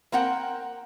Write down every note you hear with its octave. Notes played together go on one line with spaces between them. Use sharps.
A#3 C4 A#4 F#5 G5